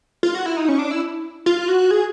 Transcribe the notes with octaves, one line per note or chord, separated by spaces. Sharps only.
F4
F#4
E4
D#4
C#4
D4
E4
F4
F#4
G#4